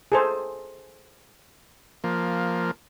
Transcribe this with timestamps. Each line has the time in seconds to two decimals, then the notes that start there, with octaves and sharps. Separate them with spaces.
0.12 G#4 A4 C5
2.04 F3 A#3